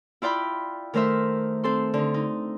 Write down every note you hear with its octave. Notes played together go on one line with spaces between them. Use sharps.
E4 F4 D5 G5 B5
D#3 A3 A#4 C5 E5
C4 A4 C6
D3 D#4
D#4